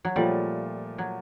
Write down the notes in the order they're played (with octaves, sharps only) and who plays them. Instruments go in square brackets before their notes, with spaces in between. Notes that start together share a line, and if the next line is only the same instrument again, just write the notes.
[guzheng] F#3
[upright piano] A#2 F3 A3 [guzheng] G3
[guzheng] F#3